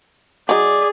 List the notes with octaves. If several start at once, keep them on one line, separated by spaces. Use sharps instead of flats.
F#3 D#4 G#4 D5